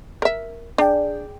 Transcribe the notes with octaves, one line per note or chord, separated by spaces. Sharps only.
A#4 E5
D4 G#4 D5 G5